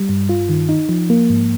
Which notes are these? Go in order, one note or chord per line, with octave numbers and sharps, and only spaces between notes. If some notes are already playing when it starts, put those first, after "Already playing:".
Already playing: G3
G2
F4
D#3
D#4
F3
A#3
G#2